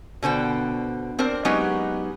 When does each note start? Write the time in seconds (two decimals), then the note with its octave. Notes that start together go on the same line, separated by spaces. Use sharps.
0.22 B2 D3 C5 G5
1.19 C4 D4 A#4 C5
1.45 F#3 G#3 B3 C#4 D#4 G4